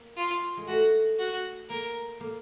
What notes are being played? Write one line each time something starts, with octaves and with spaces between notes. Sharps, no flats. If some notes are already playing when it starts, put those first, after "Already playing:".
Already playing: A#3
F4
G#3
A3 F#4
F#4
A#3 A#4
A#3